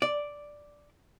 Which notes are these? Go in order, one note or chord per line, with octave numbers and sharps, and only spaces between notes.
D5